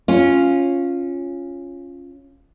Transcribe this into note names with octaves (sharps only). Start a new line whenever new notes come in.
C#4 F4